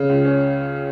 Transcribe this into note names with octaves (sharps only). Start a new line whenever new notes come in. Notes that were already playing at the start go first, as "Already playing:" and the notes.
Already playing: C#3
C#2
C#4